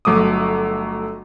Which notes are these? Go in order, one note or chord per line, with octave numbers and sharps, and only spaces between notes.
G1 F#3 A3 D6 D#6